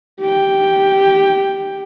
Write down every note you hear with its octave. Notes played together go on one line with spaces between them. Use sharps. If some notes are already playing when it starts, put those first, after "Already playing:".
G4 G5